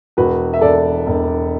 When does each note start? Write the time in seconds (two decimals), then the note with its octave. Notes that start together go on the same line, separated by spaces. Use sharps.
0.17 E1 F#4 B4
0.54 E5
0.61 E1 A4 D5
1.06 E1